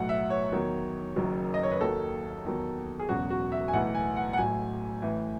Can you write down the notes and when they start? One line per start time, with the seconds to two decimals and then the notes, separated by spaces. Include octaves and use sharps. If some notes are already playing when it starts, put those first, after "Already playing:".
Already playing: B1 A2 F#3 F#5
0.09 E5
0.30 C#5
0.52 E2 D#3 F#3
1.16 F#1 F#2 D#3 F#3
1.54 D#5
1.63 C#5
1.72 B4
1.80 D#2 D#3 F#3 A4
2.45 E2 D#3 F#3
3.00 G#4
3.09 E1 E2 C#3 F#3 F#4
3.30 F#4
3.52 E5
3.68 G#5
3.73 B1 A2 E3 F#5
3.95 G#5
4.16 F#5
4.33 F#5
4.37 A1 A2 F#3 G#5
5.02 A1 A2 E3